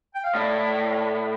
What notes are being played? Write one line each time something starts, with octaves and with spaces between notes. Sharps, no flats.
G5
F5
A2 D5